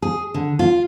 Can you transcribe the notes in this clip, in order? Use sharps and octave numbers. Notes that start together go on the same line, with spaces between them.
G#4
D3
F4